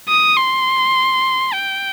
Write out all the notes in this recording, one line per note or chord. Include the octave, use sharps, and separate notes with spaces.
D#6
C6
G5